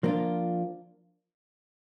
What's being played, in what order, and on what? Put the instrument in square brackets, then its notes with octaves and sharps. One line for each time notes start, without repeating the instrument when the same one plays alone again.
[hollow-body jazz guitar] F3 A#3 D4 F4